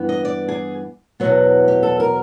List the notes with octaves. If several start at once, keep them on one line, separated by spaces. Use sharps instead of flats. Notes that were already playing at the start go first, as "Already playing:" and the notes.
Already playing: G2 E3 B3
D#5
D5
G#4
E2 B2 F#3 B3
G4
A4
A#4